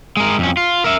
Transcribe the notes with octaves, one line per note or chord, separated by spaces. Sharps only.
G#3 A#4
F2 C#4
F4
A#4 E5